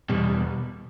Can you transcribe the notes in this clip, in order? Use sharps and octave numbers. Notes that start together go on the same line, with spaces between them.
E2 B2 G3